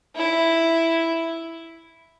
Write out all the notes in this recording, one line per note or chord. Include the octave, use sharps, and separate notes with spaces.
E4